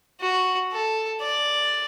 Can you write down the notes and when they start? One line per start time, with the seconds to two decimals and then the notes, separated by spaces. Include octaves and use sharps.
0.21 F#4
0.72 A4
1.22 D5